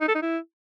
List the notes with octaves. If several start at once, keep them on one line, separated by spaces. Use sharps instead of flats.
D#4
A4
D#4
E4